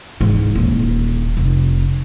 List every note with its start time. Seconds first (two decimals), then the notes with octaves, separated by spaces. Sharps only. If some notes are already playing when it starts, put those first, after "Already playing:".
0.20 G#2 E3
0.55 D#1
1.37 F1